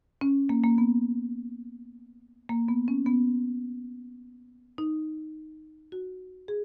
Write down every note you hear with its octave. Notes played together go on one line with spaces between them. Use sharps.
C#4
A#3
A#3
B3
A#3
B3
C#4
B3
D#4
F#4
G#4